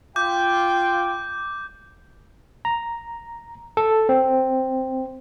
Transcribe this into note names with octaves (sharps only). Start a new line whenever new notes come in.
F4 G5 D6 G6
A#5
A4
C4